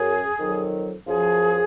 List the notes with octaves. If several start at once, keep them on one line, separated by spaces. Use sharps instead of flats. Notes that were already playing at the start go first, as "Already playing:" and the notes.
Already playing: F#2 G#4
F2 D#3 F#3
F#2 F3 G#4